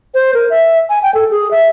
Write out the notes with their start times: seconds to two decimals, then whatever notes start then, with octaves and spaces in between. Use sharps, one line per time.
0.14 C5
0.34 A#4
0.50 E5
0.89 G#5
1.03 G5
1.14 A4
1.31 G#4
1.51 E5